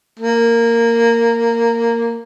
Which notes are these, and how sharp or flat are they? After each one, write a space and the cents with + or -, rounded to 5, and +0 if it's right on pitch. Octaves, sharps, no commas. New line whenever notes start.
A#3 -10